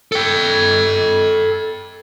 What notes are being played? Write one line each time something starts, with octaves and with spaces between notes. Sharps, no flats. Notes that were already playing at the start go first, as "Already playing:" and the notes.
A4 G5